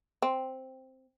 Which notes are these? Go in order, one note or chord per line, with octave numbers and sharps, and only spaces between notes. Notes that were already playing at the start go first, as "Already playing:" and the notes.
C4